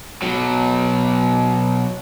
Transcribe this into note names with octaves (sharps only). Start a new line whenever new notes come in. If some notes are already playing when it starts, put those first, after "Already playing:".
B2 F#3